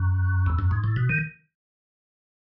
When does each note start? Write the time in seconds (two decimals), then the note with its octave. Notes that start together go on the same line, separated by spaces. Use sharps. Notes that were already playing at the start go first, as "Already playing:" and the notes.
Already playing: F#2
0.46 E2
0.59 F#2
0.71 G#2
0.84 A2
0.96 B2
1.09 D#3